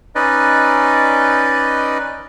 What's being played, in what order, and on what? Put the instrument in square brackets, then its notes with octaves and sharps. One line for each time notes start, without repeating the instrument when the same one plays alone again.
[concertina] C#4 D#4 B4 D5 D#5